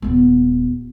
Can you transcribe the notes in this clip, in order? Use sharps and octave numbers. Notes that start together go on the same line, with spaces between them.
D#1 B3